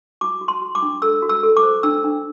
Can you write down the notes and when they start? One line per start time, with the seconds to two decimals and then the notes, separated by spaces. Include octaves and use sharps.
0.21 F#4 D6
0.41 F#4
0.48 C6
0.62 F#4
0.75 D6
0.82 D4
1.02 A4 E6
1.22 F#4
1.29 E6
1.43 A4
1.57 D6
1.63 C5
1.83 D4 E6
2.04 D4